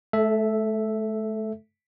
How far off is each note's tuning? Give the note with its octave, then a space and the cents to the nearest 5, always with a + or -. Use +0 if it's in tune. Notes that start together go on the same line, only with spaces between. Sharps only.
A3 -40 A4 -5 E5 +0